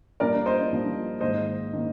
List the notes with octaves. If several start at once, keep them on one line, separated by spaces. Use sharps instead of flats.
G2 F3 A#3 A#4 D5
C5 D#5
G2 F3 A#3
G#2 D#3 A#3 C5 D#5
D#3 A#3